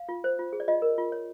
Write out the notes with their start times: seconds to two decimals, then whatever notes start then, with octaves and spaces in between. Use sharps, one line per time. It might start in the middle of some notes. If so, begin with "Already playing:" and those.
Already playing: F5
0.09 F4
0.24 C5
0.39 F4
0.53 G#4
0.60 D5
0.68 F4 D#5
0.82 A#4
0.98 F4
1.12 C#5